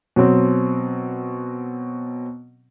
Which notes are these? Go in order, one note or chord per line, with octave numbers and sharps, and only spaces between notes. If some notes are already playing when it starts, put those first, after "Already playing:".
B2 F#3 C4